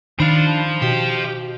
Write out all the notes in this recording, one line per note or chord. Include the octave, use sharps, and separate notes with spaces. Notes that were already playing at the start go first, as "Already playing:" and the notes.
D#3 D4 C5 F5 B5
B2 G4